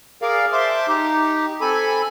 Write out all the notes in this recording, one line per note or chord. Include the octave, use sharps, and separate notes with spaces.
G#4 A#4 D5 F5
C5 E5 A5 C6 D6
D#4 G4
C4 A4 G#5 B5